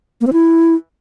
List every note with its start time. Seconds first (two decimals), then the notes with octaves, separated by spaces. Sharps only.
0.21 A#3
0.27 C4
0.33 E4